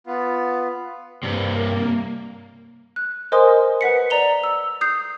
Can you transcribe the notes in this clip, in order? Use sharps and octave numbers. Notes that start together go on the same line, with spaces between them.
B3 F4
G2 C3 A#3
F#6
A#4 C5 D#5 G#5 C6 D#6
B4 F#5 B6 C#7
D5 A#5 F7 G7
E6
D#6 G6 C7